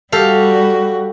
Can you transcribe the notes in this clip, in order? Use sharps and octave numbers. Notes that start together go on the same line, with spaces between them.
G3 F#4 G4 A4 F5